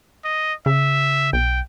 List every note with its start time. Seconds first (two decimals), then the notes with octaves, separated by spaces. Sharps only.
0.24 D#5
0.66 C#3 E5
1.33 B1 G5